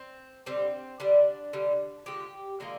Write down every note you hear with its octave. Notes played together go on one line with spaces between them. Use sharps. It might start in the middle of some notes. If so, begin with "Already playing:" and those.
Already playing: C4
D3 G3 C4
D3 G3 D4
D3 G3
D3 F3 G#3 G4
D3 F3 G#3 A#3